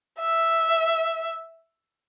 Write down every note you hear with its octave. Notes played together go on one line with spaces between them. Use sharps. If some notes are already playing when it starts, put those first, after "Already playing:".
E5